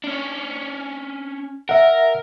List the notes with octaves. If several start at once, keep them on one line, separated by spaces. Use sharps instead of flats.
C#4 D4
A#4 E5 F#5